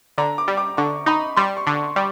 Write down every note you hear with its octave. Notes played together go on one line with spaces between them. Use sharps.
D3 A#5
D6
G3
D6
D3 C#6
D#4 B5
G3 C6
C#6
D3
C#6
G3 D6